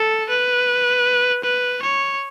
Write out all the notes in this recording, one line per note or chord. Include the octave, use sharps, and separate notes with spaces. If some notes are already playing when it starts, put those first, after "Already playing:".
Already playing: A4
B4
B4
C#5